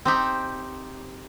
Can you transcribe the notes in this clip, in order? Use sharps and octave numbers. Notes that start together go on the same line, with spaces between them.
C4 D#4 G4